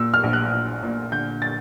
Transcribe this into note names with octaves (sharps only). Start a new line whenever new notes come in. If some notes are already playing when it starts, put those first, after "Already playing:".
Already playing: A#2 E6
F6
A#1
F#6
A#1
A#2
D3 G6
A6